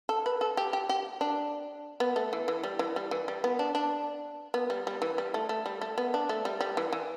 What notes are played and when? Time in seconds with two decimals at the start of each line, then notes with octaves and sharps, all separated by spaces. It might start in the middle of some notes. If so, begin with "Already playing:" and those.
0.09 A4
0.26 B4
0.41 A4
0.57 G4
0.73 G4
0.89 G4
1.21 D4
2.00 B3
2.16 A3
2.33 E3
2.48 E3
2.63 G3
2.79 E3
2.96 G3
3.11 E3
3.28 G3
3.44 B3
3.59 D4
3.75 D4
4.54 B3
4.70 G3
4.87 G3
5.02 E3
5.18 G3
5.34 A3
5.49 A3
5.66 G3
5.81 A3
5.98 B3
6.14 D4
6.29 A3
6.45 G3
6.61 G3
6.77 E3
6.93 E3